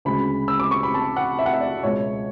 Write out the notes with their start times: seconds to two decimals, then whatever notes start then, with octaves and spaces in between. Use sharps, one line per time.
0.05 D2 C#3 G#3 B5
0.48 E6
0.60 D6
0.71 C#6
0.83 B5
0.94 A5
1.16 F#5
1.39 E5
1.46 F#5
1.54 E5
1.61 D5
1.83 C#2 B2 G#3 C#5